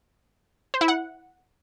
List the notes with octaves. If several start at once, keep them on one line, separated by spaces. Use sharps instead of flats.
C5
E4
F#5